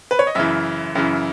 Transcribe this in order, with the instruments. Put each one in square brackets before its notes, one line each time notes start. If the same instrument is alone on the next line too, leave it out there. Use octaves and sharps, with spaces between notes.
[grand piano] B4
C#5
D#5
F#2 C#3 E3 E5
F#2 C#3 E3